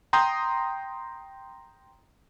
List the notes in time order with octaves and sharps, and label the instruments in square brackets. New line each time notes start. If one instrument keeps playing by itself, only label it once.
[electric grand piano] G5 A#5 C6 D#6 G6